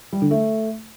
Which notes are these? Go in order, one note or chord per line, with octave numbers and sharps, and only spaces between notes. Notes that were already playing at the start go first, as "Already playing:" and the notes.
G3
D3
A3